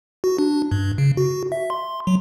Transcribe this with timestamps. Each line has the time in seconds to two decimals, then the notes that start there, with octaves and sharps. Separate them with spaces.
0.24 F#4
0.38 D4
0.71 G2
0.98 C#3
1.17 F#4
1.52 E5
1.70 C6
2.07 F#3